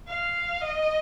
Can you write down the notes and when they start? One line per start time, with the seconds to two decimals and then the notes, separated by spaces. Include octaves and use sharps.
0.08 F5
0.61 D#5